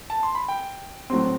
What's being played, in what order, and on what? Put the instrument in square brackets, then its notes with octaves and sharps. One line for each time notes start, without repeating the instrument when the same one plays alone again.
[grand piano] A5
C6
B5
G5
[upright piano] A2 F#3 C4